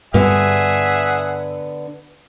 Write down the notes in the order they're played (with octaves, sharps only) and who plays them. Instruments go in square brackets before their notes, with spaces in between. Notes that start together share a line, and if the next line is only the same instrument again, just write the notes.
[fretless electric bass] G2 [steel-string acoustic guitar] D3 B3 [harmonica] G#4 E5 F#5